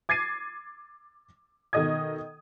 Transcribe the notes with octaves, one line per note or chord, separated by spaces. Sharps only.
D6 G#6 A6 C7 D#7
B2 D#3 A4 D#5 D#6 G#6